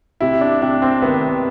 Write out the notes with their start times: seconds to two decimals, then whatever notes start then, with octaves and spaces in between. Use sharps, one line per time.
0.21 C3 E4
0.41 D4
0.62 C3 D4
0.82 C4
1.02 D#3 B3